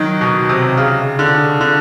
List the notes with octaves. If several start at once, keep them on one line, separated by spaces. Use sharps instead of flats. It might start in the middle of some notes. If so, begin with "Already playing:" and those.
Already playing: D#3 F#3
B2
C3
C#3
D3
D3